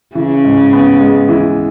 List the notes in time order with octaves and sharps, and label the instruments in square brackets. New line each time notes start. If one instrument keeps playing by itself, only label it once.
[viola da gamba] C#3 [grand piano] E3
[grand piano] G#2
B3
G#3
E3